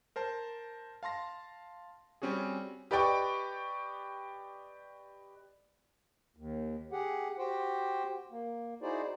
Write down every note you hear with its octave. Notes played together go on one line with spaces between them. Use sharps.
A#4 C5 A5
F5 A5 C6 A#6
G3 C4 C#4 F#4 G#4
G4 B4 D5 D#5 G5 C#6
D#2
G4 G#4 F#5
F#4 G4 C5 G5
A#3
D#4 E4 F#4 G#4 C5 D5